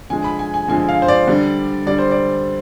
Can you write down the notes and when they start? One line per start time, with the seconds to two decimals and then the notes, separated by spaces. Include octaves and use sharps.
0.10 D3 F3 G#3 G#5
0.24 B5
0.39 G#5
0.54 G#5
0.68 D3 F3 G#3 G#5
0.89 F5
1.02 C5
1.08 D5
1.27 D3 G3
1.86 D3 G3 D5
1.99 C5
2.11 D5